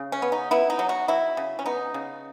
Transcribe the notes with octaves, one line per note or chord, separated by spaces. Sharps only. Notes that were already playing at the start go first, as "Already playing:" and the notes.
Already playing: C#3
C#4
B3
D#4
B3 E4
D#4
F#3
F#4
F#3 E4
C#3
C#4
B3 D#4
C#3